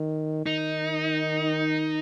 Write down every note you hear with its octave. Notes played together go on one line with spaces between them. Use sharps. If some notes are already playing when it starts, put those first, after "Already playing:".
Already playing: D#3
D#3 D#4